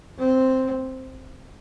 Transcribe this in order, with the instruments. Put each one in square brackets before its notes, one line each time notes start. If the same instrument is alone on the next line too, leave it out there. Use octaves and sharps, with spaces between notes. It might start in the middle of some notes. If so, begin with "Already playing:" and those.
[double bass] C4